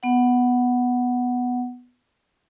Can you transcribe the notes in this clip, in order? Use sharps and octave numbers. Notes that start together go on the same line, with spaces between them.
B3 F#5